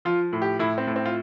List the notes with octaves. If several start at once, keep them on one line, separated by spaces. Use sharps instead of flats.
F3 F4
A2
G4
A2 E4
C4
A2
C4
F4